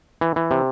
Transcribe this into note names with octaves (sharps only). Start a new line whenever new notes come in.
E3
E3
C3